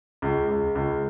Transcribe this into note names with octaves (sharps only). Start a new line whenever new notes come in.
C#2
C#2
C#2